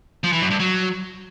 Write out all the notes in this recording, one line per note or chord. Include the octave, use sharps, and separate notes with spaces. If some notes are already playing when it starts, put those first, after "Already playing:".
F3
E3
F#2
G2
F#3